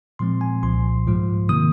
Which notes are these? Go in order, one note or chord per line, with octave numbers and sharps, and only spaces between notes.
A#2 F3 G#3 C4 C6
G#5
C2 A#2 F3 C6
G#2 F3 G#3 F4
C3 D#3 A#3 D#6